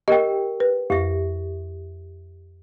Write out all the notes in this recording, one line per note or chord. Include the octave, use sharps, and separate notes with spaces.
G4 A#4 D#5 G5
B4
F2 G4 E5